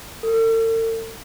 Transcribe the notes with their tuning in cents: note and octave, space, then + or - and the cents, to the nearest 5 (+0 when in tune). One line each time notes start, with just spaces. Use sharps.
A4 +45